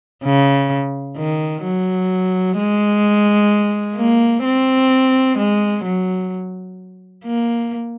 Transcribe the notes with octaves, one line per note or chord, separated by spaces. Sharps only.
C#3
D#3
F#3
G#3
A#3
C4
G#3
F#3
A#3